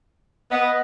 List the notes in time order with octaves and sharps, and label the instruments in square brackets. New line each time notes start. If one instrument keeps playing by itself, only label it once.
[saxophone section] B3 [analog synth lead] D#5